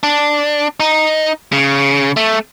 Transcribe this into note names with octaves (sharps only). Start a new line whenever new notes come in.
D4
D#4
C#3
A3